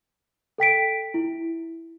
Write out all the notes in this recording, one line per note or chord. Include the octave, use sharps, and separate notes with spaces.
A4 G5 B6 D7
E4